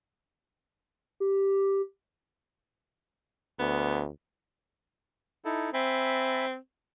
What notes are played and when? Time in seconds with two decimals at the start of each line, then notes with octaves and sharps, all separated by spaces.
1.20 G4
3.59 D2 B3
5.45 D#4 E4 A4
5.74 C4 E5 G#5 B5